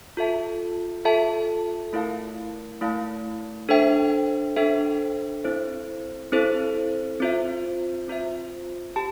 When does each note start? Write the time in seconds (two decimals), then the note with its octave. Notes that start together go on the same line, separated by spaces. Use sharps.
0.17 F4 A4 E5 A5
1.05 F4 A4 E5 A5
1.93 A3 E4 A#4 F5 A5
2.81 A3 E4 A#4 F5 A5
3.69 D4 A4 C5 E5 G5
4.56 D4 A4 C5 E5 G5
5.44 C4 E4 A4 C5
6.32 C4 E4 A4 C5
7.20 C4 F4 C5 E5
8.08 C4 F4 C5 E5
8.96 G4 A5